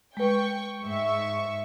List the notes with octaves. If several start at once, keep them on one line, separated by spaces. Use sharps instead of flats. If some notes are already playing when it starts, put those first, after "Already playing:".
G#3 B4 G5 C#6
G#2 E5 C#6